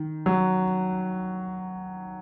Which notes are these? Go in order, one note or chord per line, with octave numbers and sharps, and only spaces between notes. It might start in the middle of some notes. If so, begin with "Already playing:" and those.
Already playing: D#3
F#3